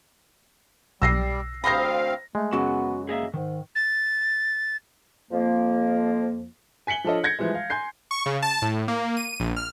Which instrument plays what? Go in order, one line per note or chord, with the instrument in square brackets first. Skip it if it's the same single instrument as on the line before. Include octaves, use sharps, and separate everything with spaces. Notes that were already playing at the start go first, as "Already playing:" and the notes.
[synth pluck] B1 [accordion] G3 [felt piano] E6 A#6 C7
[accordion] D2 C4 F5 [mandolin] C5 D#5 A#5 [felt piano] B5 A#6
[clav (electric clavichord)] G#3 [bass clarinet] A3
[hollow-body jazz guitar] F#2 C#3 F#3 [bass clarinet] B3 [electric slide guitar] F#4
[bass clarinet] A#3 [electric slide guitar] G#4 D#5 E5
[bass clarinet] G#2 [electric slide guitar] D#3
[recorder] A6
[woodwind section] F2 F3 A#3
[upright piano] G#5 B6 C#7 F#7 G7
F3 D4 F4 A4 C#5 D#5
G6 G#6 A#6 C#7
E3 F3 G3 G#3
F5
G#5 C6 G6 C7
[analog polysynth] C#6
C#3
A5
A2
A#3
D#7
A#1
F6